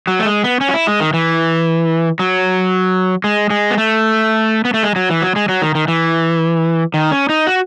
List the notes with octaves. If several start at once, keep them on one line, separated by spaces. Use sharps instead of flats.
F#3
A3
G#3
B3
C#4
F#4
E4
G#3
D#3
E3
F#3
G#3
G#3
B3
A3
B3
A3
G#3
F#3
E3
F#3
G#3
F#3
D#3
D#3
E3
D#3
C#4
D#4
F#4